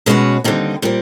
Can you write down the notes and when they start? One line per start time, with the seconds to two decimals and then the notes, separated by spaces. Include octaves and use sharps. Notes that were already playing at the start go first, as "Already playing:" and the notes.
0.06 B2 G#3 C#4 F#4 B4
0.44 D#2 D3 G3 C4 D#4
0.82 A#2 G3 C4